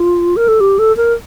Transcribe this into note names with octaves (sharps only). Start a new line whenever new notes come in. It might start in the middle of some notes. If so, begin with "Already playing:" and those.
Already playing: F4
A#4
A4
G4
A4
A#4